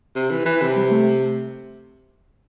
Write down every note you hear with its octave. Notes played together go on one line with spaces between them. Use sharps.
C3
E3
E3
C3
G3
A3